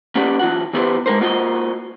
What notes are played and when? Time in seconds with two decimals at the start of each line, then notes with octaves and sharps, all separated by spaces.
0.15 A#3 C#4 G4 B4 D5 F#5
0.39 E3 F4 F#4 F#5
0.73 E3 B3 E4 G4 B4 C5
1.06 G#3 A#4 C5
1.20 A#3 F4 F#4 C5 D5 D#5